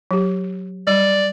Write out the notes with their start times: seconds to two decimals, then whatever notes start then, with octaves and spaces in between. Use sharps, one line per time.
0.11 F#3 G4
0.87 G3 D5